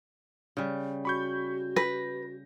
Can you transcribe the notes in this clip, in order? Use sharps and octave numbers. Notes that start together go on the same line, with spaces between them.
C#3 G3
F#4 B5 C#6 G6
B4 A#6